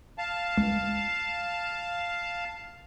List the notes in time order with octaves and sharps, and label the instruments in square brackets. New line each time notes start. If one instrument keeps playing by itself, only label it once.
[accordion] F5 A5
[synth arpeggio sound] C#2